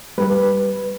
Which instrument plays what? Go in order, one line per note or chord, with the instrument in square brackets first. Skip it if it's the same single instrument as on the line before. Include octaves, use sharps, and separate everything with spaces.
[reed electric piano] G3 B4